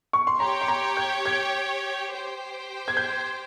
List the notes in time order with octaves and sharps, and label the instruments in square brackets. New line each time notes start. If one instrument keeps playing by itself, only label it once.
[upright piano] C#6
C6
[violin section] G4 C#5 G5 [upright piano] A#5
[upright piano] C6
A#5
G6
G#6
[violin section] G4 C5 G5
[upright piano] G#6
G6